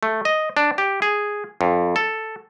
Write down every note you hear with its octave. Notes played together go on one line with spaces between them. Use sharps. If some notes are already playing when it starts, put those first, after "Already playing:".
A3
D#5
D4
G4
G#4
F2
A4